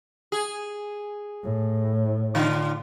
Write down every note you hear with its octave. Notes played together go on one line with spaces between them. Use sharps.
G#4
A2
D3 D4 F4